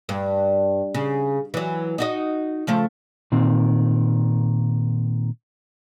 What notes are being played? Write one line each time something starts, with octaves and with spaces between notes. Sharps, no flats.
G2
C#3
E3 F#3
D#4 F#4 D#5
C#3 F3 A3
A#2 D#3 C4